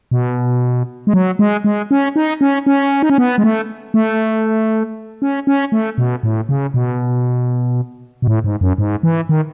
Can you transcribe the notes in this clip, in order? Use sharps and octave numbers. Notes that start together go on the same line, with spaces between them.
B2
G#3
F#3
G#3
G#3
C#4
D#4
C#4
C#4
D#4
C#4
B3
G#3
A3
A3
C#4
C#4
A3
B2
A2
C#3
B2
B2
A2
G#2
F#2
G#2
E3
D#3